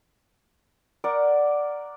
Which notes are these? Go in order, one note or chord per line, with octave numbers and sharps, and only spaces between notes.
A#4 D5 F#5